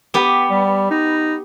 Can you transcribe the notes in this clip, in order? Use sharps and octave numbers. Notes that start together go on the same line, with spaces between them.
B3 G4
G3
D#4